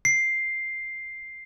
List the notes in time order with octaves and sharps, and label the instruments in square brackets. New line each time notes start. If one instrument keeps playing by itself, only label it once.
[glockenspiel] C7